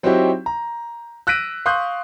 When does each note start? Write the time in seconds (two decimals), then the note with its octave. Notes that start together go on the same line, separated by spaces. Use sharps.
0.03 F#3 C4 D#4 E4 F#4 G4
0.46 A#5
1.27 E6 F#6 A#6 B6 D7 D#7
1.66 F5 C6 C#6 D#6 F#6 G6